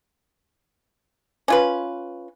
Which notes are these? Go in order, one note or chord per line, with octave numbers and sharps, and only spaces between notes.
C#4 F4 B4